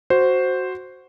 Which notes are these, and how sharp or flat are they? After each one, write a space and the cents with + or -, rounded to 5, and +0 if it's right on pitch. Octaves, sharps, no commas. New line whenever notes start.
F#4 +0 C5 +0